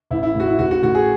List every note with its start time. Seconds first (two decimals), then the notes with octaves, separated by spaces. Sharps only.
0.11 A1 E4
0.23 E4
0.35 A2 F#4
0.47 E4
0.59 A1 F#4
0.71 F#4
0.82 A2 F#4
0.95 G#4